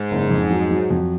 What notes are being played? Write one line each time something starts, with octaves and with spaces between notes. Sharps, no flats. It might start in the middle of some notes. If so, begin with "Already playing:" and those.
Already playing: G#2
F#1
F2
F#3
F#3
F2